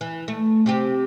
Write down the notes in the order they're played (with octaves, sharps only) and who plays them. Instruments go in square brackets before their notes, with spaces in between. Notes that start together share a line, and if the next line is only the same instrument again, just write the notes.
[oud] E3
A3
C3 C4 G4